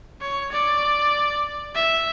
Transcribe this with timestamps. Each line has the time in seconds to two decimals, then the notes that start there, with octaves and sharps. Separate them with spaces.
0.21 C#5
0.52 D5
1.75 E5